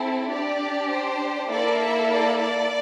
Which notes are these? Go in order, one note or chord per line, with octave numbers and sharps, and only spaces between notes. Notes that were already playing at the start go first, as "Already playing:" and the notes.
Already playing: C4 E4 A4
D4 G4 D5
C5
A#3 E4 A4 D5
E5
D5
D5